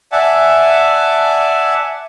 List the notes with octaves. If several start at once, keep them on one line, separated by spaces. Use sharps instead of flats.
D5 E5 F#5 G#5 A5